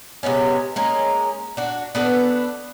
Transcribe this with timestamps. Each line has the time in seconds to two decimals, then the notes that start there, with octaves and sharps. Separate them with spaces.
0.23 C3 G#3 B3 C#4
0.76 G#3 A#3 C#4
1.57 D4 F#4
1.95 B3 D4 A4 B4